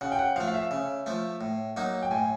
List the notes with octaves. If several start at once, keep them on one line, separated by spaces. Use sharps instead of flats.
C#3 F#5
G5
F#5
F3 A3 F5
F5
E5
C#3
F3 A3
A2
F#3 A#3 D#4
G5
A2 G#5